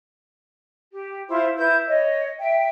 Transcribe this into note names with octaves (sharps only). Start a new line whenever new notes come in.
G4
E4 F4 C5 C6
E4 B4 G6
C#5 D#5
E5 G5